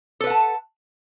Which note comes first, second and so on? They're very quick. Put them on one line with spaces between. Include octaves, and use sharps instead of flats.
A4 B4 F#5 A5